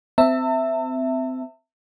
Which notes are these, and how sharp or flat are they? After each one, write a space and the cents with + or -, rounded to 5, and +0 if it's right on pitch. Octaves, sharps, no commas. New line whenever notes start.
C4 -25 E5 +0 A5 +45